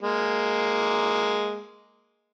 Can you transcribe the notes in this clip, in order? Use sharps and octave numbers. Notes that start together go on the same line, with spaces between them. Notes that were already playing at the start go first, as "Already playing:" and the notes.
G#3 A#3